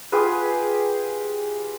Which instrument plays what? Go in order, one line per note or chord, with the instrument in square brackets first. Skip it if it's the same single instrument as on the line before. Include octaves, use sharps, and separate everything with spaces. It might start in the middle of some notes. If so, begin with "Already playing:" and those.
[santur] F4 G4 G#4 B4